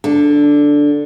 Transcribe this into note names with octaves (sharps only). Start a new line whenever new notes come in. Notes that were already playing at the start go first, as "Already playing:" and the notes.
D3